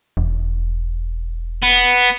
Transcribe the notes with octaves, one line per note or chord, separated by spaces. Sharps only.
E1
B3